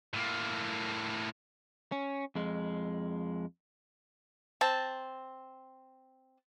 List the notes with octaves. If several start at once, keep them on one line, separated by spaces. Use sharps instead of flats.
A2 A#3
C#4
F2 G#3
C4 A5